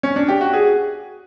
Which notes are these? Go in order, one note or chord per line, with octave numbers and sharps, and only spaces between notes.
C#4
D4
G4
F#4
G#4